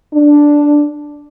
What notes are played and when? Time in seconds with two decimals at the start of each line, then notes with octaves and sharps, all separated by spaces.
0.14 D4